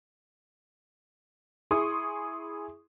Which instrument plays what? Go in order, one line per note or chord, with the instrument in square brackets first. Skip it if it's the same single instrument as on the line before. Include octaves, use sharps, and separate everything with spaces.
[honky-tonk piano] E4 G#4 C6 C#6 D#6